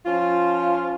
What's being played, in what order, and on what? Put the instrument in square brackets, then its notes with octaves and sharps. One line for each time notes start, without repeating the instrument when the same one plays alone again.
[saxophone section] F3 C#4 F4